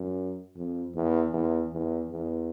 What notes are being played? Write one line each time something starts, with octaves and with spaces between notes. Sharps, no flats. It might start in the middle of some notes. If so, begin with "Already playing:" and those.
Already playing: F#2
F2
E2
E2
E2
E2